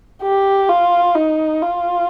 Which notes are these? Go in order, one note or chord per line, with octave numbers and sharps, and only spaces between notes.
G4
F4
D#4
F4